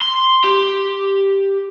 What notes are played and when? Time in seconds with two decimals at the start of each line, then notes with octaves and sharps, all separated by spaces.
0.01 C6
0.44 G4